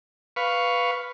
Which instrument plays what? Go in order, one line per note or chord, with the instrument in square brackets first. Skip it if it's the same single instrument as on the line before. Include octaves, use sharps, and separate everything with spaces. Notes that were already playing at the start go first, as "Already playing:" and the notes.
[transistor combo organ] B4 F5 C#6